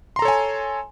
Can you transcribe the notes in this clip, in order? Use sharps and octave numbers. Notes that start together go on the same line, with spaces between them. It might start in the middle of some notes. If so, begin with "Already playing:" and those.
A4 C#5 G#5 A#5 C6